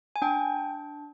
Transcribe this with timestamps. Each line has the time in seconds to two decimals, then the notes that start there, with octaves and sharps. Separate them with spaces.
0.16 G#5
0.22 D4 G5